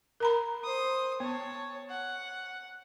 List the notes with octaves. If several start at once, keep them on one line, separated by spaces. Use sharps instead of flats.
A#4 A#5 B5
C5 D#6
B3 C#5 A5
F#5